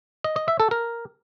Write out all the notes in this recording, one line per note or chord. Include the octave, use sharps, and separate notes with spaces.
D#5
D#5
E5
A4
A#4